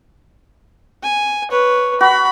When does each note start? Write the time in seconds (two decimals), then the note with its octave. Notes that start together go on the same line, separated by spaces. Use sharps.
1.03 G#5
1.51 B4 C#5
2.01 F#4 B5